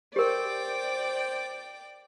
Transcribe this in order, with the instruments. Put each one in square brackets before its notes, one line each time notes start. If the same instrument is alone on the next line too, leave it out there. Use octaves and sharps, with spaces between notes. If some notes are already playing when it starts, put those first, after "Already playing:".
[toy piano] G4 A#4 [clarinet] C5 [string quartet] D5 G5 D6